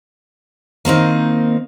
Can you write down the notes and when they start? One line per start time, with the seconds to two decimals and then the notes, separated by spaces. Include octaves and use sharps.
0.85 D#3 A#3 C4 D#4